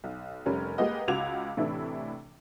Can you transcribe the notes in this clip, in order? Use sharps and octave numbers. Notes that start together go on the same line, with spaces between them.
B1
F1 G3 C#4 A#4
G#3 A#3 G4 B4 D#5 F#5
C#2 F4 F#4 D6 G#6 F7
A2 C3 E3 D4 E4